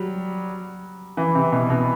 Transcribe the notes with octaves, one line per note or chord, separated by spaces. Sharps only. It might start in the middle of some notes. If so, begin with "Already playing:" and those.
Already playing: F#3 G3
E3
C3
B2
B2